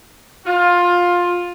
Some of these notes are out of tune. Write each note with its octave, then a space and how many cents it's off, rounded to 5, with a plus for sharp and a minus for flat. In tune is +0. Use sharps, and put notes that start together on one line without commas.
F4 +15